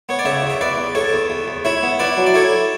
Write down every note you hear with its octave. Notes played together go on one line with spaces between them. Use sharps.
B3 C#5
D5
C#3 C#5 E5
E2
E5
E2 B4 D5
E2
E2 A4 C#5
E2
E2
E2
E4 C#5 E5
B3
E4 B4 D5
F#3
D5
E4 A4 C#5